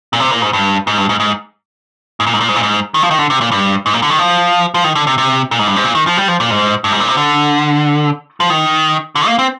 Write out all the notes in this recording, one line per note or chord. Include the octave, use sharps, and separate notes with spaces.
A#2
C3
A#2
G#2
G2
G#2
G2
G#2
G#2
G#2
A#2
G#2
A#2
G#2
A#2
G#2
D#3
F3
D#3
D3
C3
A#2
G2
G#2
A#2
D3
D#3
F3
F3
D#3
D3
C3
C3
A#2
G#2
G2
G#2
A#2
D#3
F3
G3
F3
A#2
G#2
G2
G#2
A#2
C3
D3
F3
D#3
D3
A#3
C4